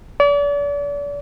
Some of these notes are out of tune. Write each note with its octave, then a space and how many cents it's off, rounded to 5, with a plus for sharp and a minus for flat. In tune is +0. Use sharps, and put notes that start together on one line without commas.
D5 -40